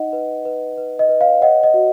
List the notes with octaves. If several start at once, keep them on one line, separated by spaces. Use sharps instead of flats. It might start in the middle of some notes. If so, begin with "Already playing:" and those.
Already playing: D#4 D#5 F#5
B4
B4
B4
D#5
B4
F5
C#5 D#5 F#5
D#5
F#4